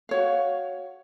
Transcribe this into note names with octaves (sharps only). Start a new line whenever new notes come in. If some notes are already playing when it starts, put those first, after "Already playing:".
F#4 C#5 F5